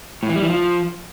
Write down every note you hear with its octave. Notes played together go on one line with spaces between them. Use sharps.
A2
E3
G3
E3
F3